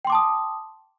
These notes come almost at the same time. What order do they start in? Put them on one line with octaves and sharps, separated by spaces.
G5 C6 D6 A5 D#6